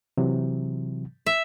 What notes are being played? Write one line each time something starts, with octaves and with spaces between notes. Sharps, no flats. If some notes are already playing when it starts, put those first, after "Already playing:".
C3 E3 F#3
E5